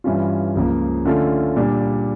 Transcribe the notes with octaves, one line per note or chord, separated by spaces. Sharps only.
G2 E3 G3 C#4 F4
C#2 C#3 F3 A#3
D3 A3 C#4 F4 A4
A#2 G3 D4